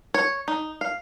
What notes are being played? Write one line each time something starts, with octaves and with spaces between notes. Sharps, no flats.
C#5
D#4
F5